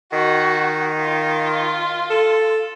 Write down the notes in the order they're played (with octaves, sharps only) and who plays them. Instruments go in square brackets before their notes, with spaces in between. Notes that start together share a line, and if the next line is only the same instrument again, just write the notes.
[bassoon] D#3 [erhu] F#4
[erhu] F4
[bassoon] A4